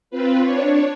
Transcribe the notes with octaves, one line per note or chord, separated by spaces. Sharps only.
C4 F4 B4
D4 C#5